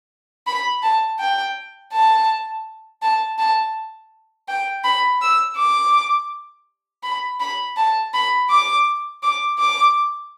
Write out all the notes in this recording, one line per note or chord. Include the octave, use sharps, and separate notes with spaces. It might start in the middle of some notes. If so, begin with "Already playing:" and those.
B5
A5
G5
A5
A5
A5
G5
B5
E6
D6
B5
B5
A5
B5
D6
D6
D6